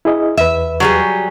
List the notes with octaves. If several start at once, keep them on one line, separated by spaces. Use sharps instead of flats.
E4 G#4 D#5
E2 B4 E5
F#3 G3 G#4